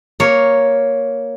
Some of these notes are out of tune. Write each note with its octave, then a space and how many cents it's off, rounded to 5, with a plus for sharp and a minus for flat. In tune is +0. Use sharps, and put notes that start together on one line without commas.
A#3 +0 C#5 +0